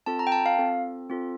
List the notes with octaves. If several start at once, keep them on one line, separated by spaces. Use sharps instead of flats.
C4 F4 A4 A5
A#5
G5
A5
F5
C4 F4 A4
C4 F4 A4